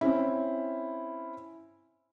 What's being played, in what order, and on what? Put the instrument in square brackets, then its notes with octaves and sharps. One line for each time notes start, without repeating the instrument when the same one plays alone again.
[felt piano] C4 C#4 E4